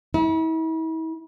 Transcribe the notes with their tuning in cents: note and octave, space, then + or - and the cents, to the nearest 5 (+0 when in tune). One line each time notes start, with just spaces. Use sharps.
E4 -40